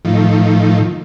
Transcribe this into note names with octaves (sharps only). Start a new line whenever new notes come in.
A2 D#3 F3